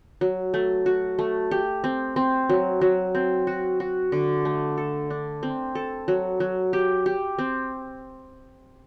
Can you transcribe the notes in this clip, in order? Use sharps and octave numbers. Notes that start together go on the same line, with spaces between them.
F#3
A3
F#4
A3
G4
C4
C4
F#3
F#3
C4
F#4
F#4
D3
A3
A4
D4
C4
A4
F#3
F#3
G4
G4
C4